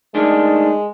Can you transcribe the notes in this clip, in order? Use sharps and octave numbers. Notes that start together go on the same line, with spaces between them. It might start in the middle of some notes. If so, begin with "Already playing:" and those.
D#3 G#3 A3 D4